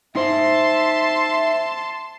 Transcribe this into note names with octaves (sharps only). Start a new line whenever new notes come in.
D#4 C5 E5 A5 C6